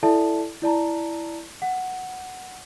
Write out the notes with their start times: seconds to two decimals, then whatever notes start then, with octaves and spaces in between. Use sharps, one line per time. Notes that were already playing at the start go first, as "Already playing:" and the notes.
0.03 E4 A4 D5 E5 G#5 A5
0.62 E4 D5 A5 A#5
1.62 F#5